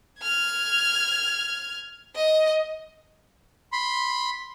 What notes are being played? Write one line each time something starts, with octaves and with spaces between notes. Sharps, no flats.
F6 G#6
D#5
B5 C6